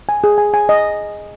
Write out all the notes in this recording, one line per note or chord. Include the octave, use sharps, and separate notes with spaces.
G#5
G#4
G#5
G#5
D#5